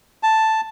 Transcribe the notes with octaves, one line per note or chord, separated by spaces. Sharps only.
A5